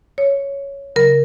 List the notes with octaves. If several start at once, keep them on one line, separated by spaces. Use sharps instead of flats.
C#5
C#3 F#3 A#4